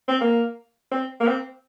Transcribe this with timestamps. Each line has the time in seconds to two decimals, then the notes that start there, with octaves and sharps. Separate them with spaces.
0.08 C4
0.21 A#3
0.92 C4
1.21 A#3
1.27 C4